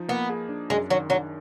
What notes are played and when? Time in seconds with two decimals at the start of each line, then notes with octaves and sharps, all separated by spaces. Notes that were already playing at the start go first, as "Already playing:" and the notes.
Already playing: F3 D#4
0.08 A#3 B3
0.30 G#4
0.49 D4
0.70 F#2 G#3
0.90 D#3 F#3
1.10 F#3 D4